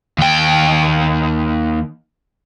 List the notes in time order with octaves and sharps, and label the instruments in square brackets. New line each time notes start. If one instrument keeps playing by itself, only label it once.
[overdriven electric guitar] D#2 G5